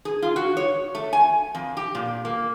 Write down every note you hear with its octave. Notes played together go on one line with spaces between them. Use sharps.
G#4
F4
F#4
C#5
A3
G#5
F2
G4
A#2
A#3